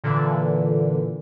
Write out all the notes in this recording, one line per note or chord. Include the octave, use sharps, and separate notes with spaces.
A#2 D3 E3